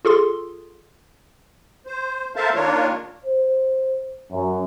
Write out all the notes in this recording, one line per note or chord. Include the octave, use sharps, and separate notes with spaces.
F4 G#4 A4 C6
C5
A4 A#4 C5 E5 F5 A5
D#3 A#3 D4 F4 A#4 C#5
C5
F#2